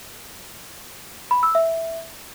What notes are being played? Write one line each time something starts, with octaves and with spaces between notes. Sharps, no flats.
B5
E6
E5